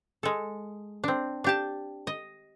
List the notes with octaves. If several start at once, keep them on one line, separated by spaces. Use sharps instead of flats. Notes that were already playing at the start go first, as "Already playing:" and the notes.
G#3 A4
C4 D4
D4 G4 A5
D#5